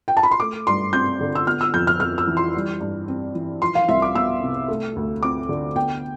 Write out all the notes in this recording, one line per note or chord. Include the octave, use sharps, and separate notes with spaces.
G5
A5
B5
C6
A3 D6
G2 C6
C4 G6
D3
E6
B3 F6
E6
F2 G6
F6
F2 F6
E6
E3
C6
G3
G2
C4
E3
F3 C6
F5
C2 E5
D6
B3 E6
C3
A3
D2
C4 D6
D3
B3 G5